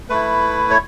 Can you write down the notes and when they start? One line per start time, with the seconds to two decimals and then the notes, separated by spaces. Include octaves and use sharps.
0.10 A3 E4 B4
0.70 C#5